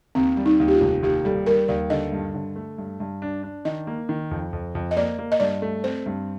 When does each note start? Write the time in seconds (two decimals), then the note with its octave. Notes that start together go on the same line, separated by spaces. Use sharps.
0.15 D#2 C4
0.37 G3
0.46 D#4
0.60 D#2
0.68 G4
0.74 F4
0.81 F1
1.03 D#2 G4
1.25 G3 A4
1.46 G3 A#4
1.68 D#2 D5
1.90 D3 D#5
2.12 G2
2.34 D3
2.56 A3
2.78 G2
3.00 G2
3.22 D4
3.43 D4
3.65 D#3 D#5
3.87 A#3
4.09 D#3
4.31 F2
4.53 F2
4.75 F2
4.91 D#5
4.97 A#3 D5
5.19 A#3
5.32 D#5
5.40 G2 D5
5.62 A3
5.84 C4 C5
6.06 G2